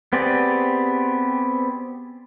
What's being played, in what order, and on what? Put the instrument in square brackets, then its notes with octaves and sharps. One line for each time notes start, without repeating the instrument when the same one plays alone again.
[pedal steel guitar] B3 C4 G4 G#4 D5